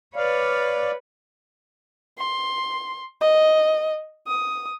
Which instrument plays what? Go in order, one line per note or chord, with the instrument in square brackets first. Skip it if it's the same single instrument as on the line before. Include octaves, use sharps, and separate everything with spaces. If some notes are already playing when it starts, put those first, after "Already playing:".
[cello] B4 C#5 [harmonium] D5 F5
[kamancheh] C6
D#5
D#6